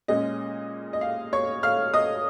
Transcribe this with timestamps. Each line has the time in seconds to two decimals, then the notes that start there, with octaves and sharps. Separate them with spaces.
0.08 A#2 G#3 C#4 D#5
0.93 D#5
1.01 F5
1.33 C#5 C#6
1.63 F5 F6
1.94 D#5 D#6